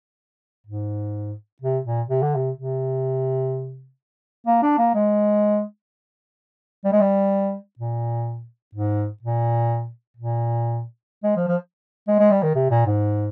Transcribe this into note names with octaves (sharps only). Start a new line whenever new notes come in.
G#2
C3
A#2
C3
D3
C3
C3
A#3
D4
A#3
G#3
G3
G#3
G3
A#2
G#2
A#2
A#2
G#3
F3
F3
G#3
G#3
G3
D#3
C3
A#2
G#2